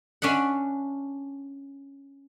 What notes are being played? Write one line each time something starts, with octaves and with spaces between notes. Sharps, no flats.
C#4 D4 E5 F#5